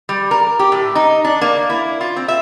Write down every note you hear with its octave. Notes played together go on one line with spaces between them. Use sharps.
G3
A#4
G4
A2
D#4
D4
A#3
E4
F4
C4
E5